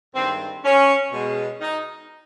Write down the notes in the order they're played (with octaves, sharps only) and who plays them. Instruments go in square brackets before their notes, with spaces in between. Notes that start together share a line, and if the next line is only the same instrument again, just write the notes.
[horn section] G2 D#3 G#3 C4
C#4
B2 G#3
D#4